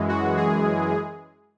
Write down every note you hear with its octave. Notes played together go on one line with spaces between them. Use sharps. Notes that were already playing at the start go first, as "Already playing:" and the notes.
Already playing: F#2 E3 G#3
F#4
G#4